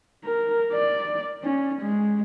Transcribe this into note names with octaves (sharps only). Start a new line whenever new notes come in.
A#4
D5
C#4
G#3